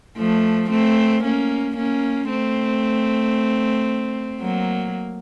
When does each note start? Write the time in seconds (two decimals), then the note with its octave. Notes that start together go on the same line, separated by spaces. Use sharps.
0.17 F3 A3
0.70 A3 C4
1.23 A#3 C#4
1.76 A#3 C#4
2.29 A3 C4
4.41 F#3 A#3